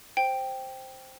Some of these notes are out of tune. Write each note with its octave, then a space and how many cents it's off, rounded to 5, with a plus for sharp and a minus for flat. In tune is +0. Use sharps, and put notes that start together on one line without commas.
C5 +0 G5 +0